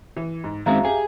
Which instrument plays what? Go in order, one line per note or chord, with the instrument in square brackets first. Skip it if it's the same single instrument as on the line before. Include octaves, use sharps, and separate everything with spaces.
[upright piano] E3
G#2
[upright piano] F#2 F#4 [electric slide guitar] D#3 G#3 C4 [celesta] E5 F5 A#5
[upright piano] G4 [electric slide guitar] G#4